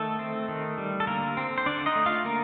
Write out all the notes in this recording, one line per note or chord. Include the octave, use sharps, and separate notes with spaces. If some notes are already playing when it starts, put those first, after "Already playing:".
Already playing: D#3 A3 A4
C4
D#3
G3
A4
D3 A#3 A#4
C4
C5
D3 D4 D5
D#4 D#5
A3
F4 F5
D3 A#3 A#4